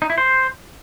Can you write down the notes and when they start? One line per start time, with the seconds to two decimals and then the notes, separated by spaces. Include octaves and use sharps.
0.02 D#4
0.10 E4
0.18 C5